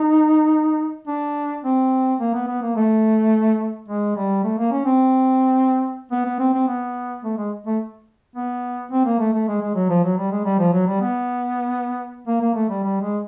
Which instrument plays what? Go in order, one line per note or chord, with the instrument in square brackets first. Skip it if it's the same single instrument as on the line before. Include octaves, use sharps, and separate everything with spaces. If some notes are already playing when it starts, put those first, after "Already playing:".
Already playing: [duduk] D#4
D4
C4
A#3
B3
B3
A#3
A3
G#3
G3
A3
A#3
C#4
C4
B3
B3
C4
C4
B3
A3
G#3
A3
B3
C4
A#3
A3
A3
G#3
G#3
F#3
F3
F#3
G3
G#3
G3
F3
F#3
G3
B3
A#3
A#3
A3
G3
G3
G#3